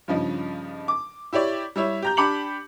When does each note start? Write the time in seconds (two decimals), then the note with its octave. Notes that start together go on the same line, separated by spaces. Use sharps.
0.08 G2 C#3 F3 D#4
0.88 D6
1.33 E4 G4 C#5 D5
1.76 G3 E4 C#5 E5
2.02 G4 A#5 G6
2.17 D4 G4 B5 D6 C#7 F#7